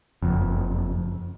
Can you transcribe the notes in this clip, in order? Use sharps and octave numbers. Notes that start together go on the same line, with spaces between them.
F#1 F2